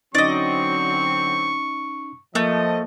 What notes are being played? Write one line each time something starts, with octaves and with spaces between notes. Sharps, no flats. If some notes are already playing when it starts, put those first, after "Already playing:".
D3 F#3 C4 C#4 D#4 D5 D#5 C#6
F3 A3 A#3 D#5